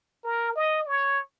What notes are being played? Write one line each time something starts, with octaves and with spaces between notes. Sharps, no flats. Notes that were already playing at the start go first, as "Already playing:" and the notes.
A#4
D#5
C#5